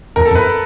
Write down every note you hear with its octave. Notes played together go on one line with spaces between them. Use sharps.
E2 A#4
A4
F2
B4